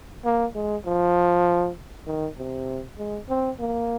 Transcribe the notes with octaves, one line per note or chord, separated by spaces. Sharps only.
A#3
G#3
F3
D#3
C3
G#3
C4
A#3